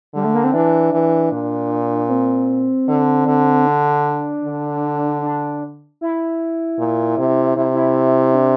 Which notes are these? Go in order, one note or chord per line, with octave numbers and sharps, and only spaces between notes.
D3 G3
A3
A#3
C4
E3 D4
E3
A#2
C4
D3
D3
D4
D3
D4
E4
A#2
C3
C3 E4
E4
D4